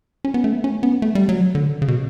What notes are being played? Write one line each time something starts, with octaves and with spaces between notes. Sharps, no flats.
C#4
B3
A3
C#4
B3
A3
G3
F#3
D3
C#3
B2